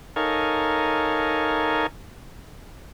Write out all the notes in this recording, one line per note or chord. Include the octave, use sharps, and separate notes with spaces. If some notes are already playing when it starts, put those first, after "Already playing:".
D#4 A4 A#4 C#5 F5 G#5